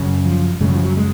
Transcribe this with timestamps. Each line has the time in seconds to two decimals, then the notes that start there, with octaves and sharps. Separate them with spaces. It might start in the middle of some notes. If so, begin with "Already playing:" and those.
Already playing: F#2 C#3
0.25 F3
0.60 F#2 C#3 G#3
0.69 F#3
0.75 F3
0.84 F#3
0.97 G#3